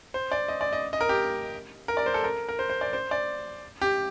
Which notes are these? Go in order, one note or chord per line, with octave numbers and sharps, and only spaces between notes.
C5
D5
D#5
D5
D#5
D#5
A#4
G4
A#4
D5
C5
A4
A#4
A#4
C5
C5
D5
C5
D5
G4